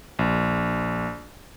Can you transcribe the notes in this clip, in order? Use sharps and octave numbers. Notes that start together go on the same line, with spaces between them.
A#1